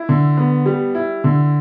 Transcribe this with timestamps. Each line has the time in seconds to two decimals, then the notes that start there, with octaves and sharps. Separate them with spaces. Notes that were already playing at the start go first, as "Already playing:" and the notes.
Already playing: E4
0.09 D3
0.37 B3
0.66 G3
0.95 E4
1.24 D3